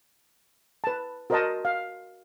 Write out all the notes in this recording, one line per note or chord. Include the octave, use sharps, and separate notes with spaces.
B4 A5
F#4 A#4 C5 D#5 F#5 A5
F5